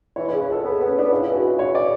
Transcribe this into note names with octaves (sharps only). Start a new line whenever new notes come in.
E3 C#5
C#3 C#5
B4
C#2 A4
B3 G#4
B3
C#4
B3 D4
C#2 E4
E3
F#4
C#2
E3 C#5
C#3 D5